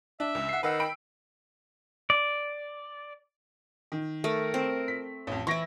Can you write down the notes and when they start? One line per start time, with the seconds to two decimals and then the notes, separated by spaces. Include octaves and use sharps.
0.20 D4 E5
0.35 C#2
0.49 F#5 C7
0.63 D#3 B4 F#5 E6
0.80 G5 B5 D7
2.10 D5
3.92 D#3
4.24 A3 A#4
4.54 C4
4.88 B6
5.27 A1 F2
5.47 E3 E4 C#6 A#6 D7